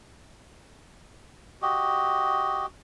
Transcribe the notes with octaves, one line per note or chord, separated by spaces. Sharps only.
F#4 G4 D#5